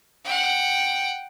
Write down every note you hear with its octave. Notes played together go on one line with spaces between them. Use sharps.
F#5 G5